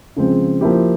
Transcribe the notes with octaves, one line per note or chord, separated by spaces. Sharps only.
C#3 F3 G#3 C4
F3 A#3 E4 G4